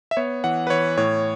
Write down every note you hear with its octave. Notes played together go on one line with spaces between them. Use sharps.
E5
B3 C#5
E3 F#5
B4
E3 C#5
A2 C#5